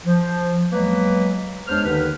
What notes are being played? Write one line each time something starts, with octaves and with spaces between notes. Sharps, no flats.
F3
E2 F#3 G#3 A#3 B4
E2 G#3 D4 C5 C#5 F6
D#2 D3 D#3 D#4 B4